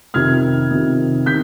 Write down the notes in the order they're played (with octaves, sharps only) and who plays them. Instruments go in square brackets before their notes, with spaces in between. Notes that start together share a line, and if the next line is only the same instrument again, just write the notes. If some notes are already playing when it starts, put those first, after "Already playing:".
[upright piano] F2 C3 D#3 F6 G#6
F2 C3 D#3
C3 D#3 G6 B6